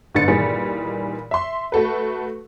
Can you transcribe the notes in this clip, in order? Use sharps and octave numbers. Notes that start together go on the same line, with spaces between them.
G1 G#2 D3 B4 A6 C#7
A#2 D#3 E3 G3 G#4
E5 C6
A3 F#4 A4 B4